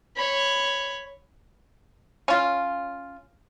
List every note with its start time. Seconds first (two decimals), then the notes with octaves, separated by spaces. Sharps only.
0.17 C#5 B5
2.28 C#4 F4